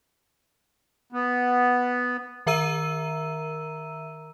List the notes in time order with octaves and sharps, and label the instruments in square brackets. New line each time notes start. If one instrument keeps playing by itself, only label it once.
[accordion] B3
[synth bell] D#3 A#4 E5 A#5 E6 D#7